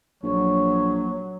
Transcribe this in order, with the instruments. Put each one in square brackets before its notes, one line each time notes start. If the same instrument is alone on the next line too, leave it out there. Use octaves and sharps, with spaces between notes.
[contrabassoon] A#1 [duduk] F#3 [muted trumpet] C#5